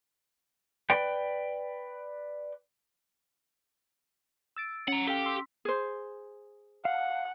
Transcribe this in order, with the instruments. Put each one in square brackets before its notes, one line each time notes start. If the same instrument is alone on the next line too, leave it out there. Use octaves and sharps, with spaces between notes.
[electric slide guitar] B4 D5 G5
[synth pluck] E6 A6 D7
[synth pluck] C#4 [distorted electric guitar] F#5 A#5
[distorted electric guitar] G4 [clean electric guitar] A4 F5 G5
[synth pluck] C6 E6 B6
[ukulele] G#4 C5
[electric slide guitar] F5 [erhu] F#5